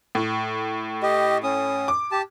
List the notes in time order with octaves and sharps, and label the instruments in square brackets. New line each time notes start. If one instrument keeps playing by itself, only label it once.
[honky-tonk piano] A2
[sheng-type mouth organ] G4 D#5
C#4 D#6
[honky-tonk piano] D6
[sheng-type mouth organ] G4 A5